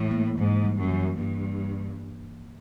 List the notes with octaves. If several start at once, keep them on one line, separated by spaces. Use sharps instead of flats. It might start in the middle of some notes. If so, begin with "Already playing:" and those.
Already playing: A2 E3
A#3
G#2 E3
G3
F#2
E3
G2 A#3